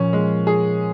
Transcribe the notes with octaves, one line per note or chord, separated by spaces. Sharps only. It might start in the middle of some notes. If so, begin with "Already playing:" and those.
Already playing: A#2 F3 C#4
G#3
G#4